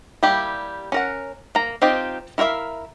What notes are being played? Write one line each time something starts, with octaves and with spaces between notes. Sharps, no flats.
G3 A#3 E4 G4
C#4 A#4 F#5
A#3 A#5
C4 D#4 F4 G4
E4 A#4 C#5 E5 F5